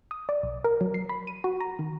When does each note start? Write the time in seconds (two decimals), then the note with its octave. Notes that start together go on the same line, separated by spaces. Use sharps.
0.11 D#6
0.29 D5
0.43 B1
0.64 A#4
0.81 F#3
0.94 C7
1.09 B5
1.27 D#7
1.44 F#4
1.60 A#5
1.79 D#3